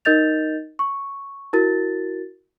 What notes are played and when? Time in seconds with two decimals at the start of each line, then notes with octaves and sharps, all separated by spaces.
0.05 D#4 A#4 D#5 G6 A6 F7
0.79 C#6
1.53 E4 F#4 A#4 A6